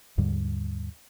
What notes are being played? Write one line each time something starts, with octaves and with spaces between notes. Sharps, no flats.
D#2 G#2 D3 G3